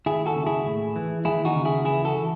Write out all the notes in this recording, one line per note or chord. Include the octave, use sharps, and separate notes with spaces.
D#2 E4 G#4
F#4 A4
C#3
E4 G#4
A2
E3
D#2 E4 G#4
D#4 F#4
C#3
E4 G#4
E3 E4 G#4
F#4 A4
E3